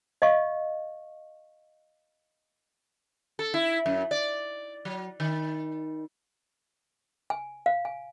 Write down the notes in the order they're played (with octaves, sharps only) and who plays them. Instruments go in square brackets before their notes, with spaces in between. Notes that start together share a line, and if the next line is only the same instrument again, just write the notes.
[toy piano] D#5 F5 C#6
[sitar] A4
E4
F#2
D5
F#3
D#3
[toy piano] G#5
F5
G#5